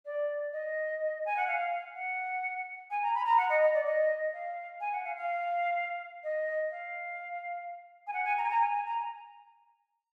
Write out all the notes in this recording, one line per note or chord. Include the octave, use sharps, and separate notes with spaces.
D5
D#5
G#5
F#5
F5
F#5
G#5
A#5
B5
A#5
F#5
D#5
D#5
D5
D#5
F5
G#5
F#5
F5
F5
D#5
F5
G#5
F#5
G#5
A#5
G#5
A#5
G#5
G#5
A#5